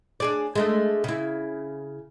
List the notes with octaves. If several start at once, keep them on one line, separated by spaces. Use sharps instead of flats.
D4 G#4 D5
G#3 A3 D4
C#3 E4